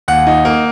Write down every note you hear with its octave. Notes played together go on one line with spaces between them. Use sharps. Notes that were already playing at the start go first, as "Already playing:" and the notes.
D#2 F#5
D#4
A#3